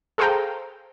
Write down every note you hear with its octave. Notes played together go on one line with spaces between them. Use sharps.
G#4 A4 C5 F5 G5 A#5